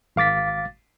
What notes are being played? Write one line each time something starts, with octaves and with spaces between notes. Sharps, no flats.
G#1 F5 D6 A6 B6